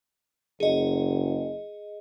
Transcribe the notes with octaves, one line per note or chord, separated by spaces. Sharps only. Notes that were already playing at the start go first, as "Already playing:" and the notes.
F#1 G#4 D#5